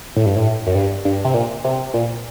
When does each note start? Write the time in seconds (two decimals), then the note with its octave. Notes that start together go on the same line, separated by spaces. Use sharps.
0.16 A2
0.26 G2
0.36 A2
0.67 F#2
0.75 G2
1.05 G2
1.25 C3
1.34 A#2
1.64 C3
1.94 A#2